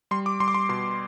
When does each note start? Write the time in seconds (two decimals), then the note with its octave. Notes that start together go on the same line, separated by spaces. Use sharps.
0.11 G3 C6
0.26 D6
0.40 G3 C6
0.48 D6
0.54 C6
0.69 B2 C6